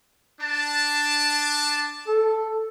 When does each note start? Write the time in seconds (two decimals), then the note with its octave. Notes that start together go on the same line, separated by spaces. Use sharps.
0.40 D4 A5
2.08 A4